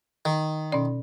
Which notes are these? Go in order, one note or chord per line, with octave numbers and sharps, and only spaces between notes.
D#3
B2 C#4 D5